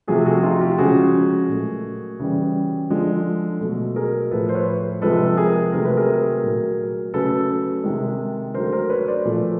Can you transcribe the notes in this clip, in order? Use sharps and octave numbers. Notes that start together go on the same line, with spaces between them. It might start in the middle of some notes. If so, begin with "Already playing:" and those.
C3 F3 A3 F#4 G#4
F#4 G#4
D#4 F4
F#4
F4 G4
C#3 F3 G#3 F#4 G#4
A#2 F#3 A3
C#3 E3 G3
D3 F3 G#3
B2 F#3 A3
G#4 A#4
A2 F3 A3 A4 B4
C5
B4 C#5
C3 F3 G#3 A4 B4
G#4 A#4
C3 D#3 F#3 A3 A#4
B4
G#4 A#4
A#2 F#3 A3
C#3 F#3 A3 A4 B4
C3 D#3 G#3
D3 F#3 A3 A#4 C5
A#4 C5
B4 C#5
C5 D5
A#2 F3 A3